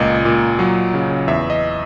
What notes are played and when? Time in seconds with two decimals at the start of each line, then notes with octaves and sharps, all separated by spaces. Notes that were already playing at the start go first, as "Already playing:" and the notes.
Already playing: C#2 A#2 D#5
0.25 A#2
0.59 F#3
0.94 C#3
1.28 E2 E5
1.50 D#5